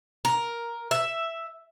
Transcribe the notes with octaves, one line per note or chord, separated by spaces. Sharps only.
A#4
E5